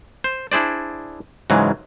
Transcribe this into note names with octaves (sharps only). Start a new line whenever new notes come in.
C5
D4 E4 G#4 C5 D5
G#2 C#3 E3 F#3 G#3